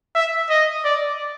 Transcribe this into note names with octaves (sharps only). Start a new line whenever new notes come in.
E5
D#5
D5